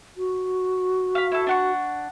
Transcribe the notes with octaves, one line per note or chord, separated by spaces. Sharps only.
F#4
F5 B5
E4 A4
D4 F#5 C#6